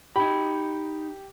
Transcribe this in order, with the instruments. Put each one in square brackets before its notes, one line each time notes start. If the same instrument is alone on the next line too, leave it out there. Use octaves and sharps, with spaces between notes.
[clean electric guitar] D#4 B5 [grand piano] G4